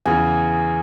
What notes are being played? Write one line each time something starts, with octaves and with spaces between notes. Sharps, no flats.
E2 C#3 E3 G#4